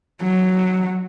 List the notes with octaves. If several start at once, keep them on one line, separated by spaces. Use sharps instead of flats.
F#3